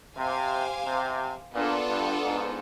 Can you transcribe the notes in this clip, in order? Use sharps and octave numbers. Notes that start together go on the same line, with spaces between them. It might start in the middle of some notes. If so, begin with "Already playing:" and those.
C3 G4 C5 F5 G#5
C3
A#2 B3 D4 F4 A4
G2
G#2